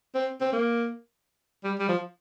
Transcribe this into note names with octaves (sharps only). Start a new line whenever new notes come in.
C4
C4
A#3
G3
G3
F3